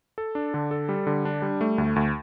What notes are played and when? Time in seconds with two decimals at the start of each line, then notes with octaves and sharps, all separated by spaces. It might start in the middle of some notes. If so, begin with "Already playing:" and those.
0.18 A4
0.35 D4
0.54 D3
0.71 A4
0.89 G3
1.07 D3
1.25 D4
1.42 G3
1.61 A3
1.78 D2
1.96 D2